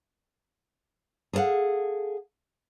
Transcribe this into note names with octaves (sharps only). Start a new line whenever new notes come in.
G#4 A4 C5 F5 F#5